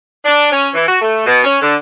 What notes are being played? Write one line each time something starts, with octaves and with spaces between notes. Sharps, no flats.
D4
C#4
E3
F#4
A3
B2
C#4
D3